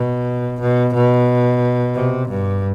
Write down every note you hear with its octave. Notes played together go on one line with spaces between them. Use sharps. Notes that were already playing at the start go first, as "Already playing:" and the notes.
Already playing: B2
B2
B2
C3
G2